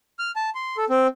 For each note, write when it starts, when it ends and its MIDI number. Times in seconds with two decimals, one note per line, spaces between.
0.19 0.31 89
0.36 0.50 81
0.55 0.77 84
0.77 0.85 69
0.90 1.07 60